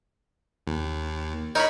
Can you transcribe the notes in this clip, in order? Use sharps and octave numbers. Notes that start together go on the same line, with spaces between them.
D#2
D#4 A#4 C#5 B5